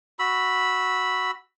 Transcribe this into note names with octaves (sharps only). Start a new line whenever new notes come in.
F#4 B5 E6